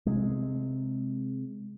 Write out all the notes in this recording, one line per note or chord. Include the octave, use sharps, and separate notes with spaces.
C3 G#3